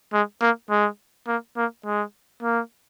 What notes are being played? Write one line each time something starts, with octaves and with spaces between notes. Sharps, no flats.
G#3
A#3
G#3
A#3
A#3
G#3
A#3